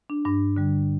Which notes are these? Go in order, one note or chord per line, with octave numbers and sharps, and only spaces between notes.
D4
G2 D4
D3 G3